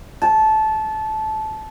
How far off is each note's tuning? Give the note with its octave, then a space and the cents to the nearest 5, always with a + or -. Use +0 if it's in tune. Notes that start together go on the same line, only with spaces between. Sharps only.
A5 -20